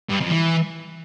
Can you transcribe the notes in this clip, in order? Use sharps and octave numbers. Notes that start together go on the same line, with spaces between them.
G2
F2
E3